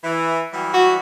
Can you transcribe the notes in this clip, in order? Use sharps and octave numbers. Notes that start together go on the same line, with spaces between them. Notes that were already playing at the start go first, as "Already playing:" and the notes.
E3
E3 F#3 G3
F#4